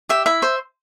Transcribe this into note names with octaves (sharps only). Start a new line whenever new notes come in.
G4 E5
E4 E5
C5